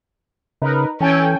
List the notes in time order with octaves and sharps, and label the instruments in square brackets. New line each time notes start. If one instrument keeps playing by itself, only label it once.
[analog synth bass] C#3 [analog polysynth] D#4 A#4 B4
[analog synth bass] E3 [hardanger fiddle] C#4 [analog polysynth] A4 G5 G#5